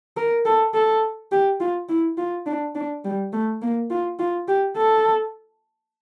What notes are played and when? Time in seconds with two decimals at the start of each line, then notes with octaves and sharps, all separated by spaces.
0.17 A#4
0.45 A4
0.74 A4
1.32 G4
1.60 F4
1.89 E4
2.18 F4
2.46 D4
2.75 D4
3.04 G3
3.33 A3
3.62 A#3
3.90 F4
4.19 F4
4.48 G4
4.77 A4